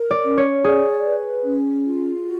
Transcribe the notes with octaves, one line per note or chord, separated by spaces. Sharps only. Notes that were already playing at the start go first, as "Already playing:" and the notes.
Already playing: A#4
D5
C#4
C#5
G#4 D5
B4
C#4
F4
F#4